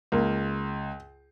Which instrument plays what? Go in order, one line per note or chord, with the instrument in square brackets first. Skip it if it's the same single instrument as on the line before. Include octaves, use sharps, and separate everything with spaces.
[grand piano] C#2 [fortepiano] A#3